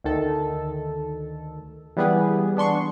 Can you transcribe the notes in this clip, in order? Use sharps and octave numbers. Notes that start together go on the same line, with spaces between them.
D2 D#3 A4
E3 G3 B3 G4 G#4 B4
B3 D4 C6 C#6